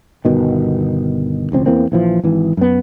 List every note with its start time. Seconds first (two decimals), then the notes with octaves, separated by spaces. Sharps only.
0.25 G1 B2 D#3
1.52 E1 C#2 C4
1.66 E2 E3 A#3 C4
1.92 A#1 E3 F3
2.24 G#1 E3
2.57 F#2 B3